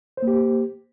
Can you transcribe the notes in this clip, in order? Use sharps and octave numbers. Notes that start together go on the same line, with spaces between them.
A#3 G4 C5